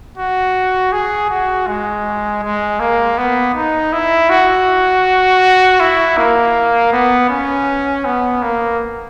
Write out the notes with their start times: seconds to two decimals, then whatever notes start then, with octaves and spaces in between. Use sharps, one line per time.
0.18 F#4
0.93 G#4
1.30 F#4
1.67 G#3
2.43 G#3
2.80 A#3
3.18 B3
3.55 D#4
3.93 E4
4.30 F#4
5.80 E4
6.17 A#3
6.92 B3
7.30 C#4
8.05 B3
8.42 A#3